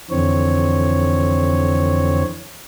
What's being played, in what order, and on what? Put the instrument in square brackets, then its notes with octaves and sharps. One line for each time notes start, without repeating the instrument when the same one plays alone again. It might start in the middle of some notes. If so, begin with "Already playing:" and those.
[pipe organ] F2 D3 E3 C4 C#5